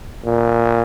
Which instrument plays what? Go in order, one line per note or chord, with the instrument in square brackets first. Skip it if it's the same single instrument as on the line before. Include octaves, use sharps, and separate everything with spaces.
[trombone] A#2